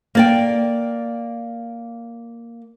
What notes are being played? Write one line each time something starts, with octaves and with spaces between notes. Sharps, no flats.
A#3 D5 G5